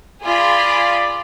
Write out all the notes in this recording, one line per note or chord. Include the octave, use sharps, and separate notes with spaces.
F4 G#4 D5 B5